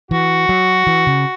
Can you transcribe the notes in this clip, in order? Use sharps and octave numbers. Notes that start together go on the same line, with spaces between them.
E3 F#4
F#3
E3
C#3